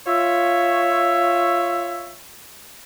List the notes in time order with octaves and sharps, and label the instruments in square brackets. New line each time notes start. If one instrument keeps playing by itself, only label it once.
[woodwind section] F4 C#5 E5